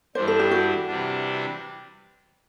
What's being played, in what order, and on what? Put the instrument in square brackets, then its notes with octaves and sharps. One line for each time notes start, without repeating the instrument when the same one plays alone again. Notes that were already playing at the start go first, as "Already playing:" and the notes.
[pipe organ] G2 E3 G3 D4 [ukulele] C5
[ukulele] A4
G4
F#4
[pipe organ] C3 E3 G3 D4